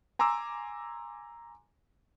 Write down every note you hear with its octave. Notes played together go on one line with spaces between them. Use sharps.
G#5 A#5 C6 D6 E6